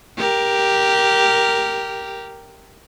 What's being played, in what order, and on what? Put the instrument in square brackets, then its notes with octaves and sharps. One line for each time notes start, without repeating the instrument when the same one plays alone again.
[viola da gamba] G4 A#4